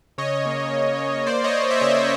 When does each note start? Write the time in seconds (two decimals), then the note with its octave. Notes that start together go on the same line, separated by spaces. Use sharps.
0.18 C#3 C#5 D#5
0.46 A#3
0.73 C#3
1.00 A#3
1.27 A#3 C5 D5
1.44 C#5 D#5
1.53 A#3
1.62 D#5
1.71 E5
1.80 C#3 C#5 D#5